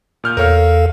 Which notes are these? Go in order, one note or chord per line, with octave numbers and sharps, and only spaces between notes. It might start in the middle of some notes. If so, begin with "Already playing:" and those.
A#2 F6 G6
E2 A4 A#4 C#5 F5 F6